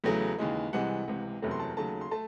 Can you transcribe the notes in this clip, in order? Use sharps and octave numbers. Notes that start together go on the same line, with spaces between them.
E2 C#3 F#3 A3
D#2 C#3 E3 G#3
C2 C3 E3 G#3 F#5
C#2 C3 E3
F#1 E2 C3 F#3 A3
C6
A5
D#2 C#3 F#3 A3 A5
C6
A3 A5